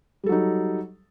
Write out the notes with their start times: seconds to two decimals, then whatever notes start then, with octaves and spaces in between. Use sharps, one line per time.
0.24 G3
0.26 A4
0.29 F#3
0.32 D#4